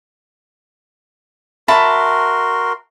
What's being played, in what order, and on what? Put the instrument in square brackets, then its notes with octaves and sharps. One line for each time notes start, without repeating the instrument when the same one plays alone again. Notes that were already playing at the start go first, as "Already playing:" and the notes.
[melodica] F#4 A#4 C6 [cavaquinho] E5 A5 B5